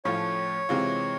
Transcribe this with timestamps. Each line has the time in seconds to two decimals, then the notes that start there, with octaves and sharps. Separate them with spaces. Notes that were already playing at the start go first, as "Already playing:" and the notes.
0.05 A2 F3 A3 C#4 F4 C#5
0.69 C3 E3 G#3 C4 F4